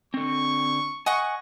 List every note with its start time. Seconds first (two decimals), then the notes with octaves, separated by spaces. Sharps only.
0.14 D3 C4 C#6
1.06 D#5 F#5 G#5 C#6